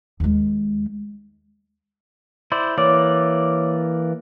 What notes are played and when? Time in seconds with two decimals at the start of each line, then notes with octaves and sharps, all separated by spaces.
0.20 D#2 G#3
2.52 E4 C5 D5
2.78 E3 A#3 C#5 D5 D6